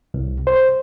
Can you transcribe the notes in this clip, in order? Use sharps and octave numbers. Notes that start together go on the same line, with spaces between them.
C2
C5